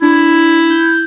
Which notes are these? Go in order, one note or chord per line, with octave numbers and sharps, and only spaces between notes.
D4 E4
G6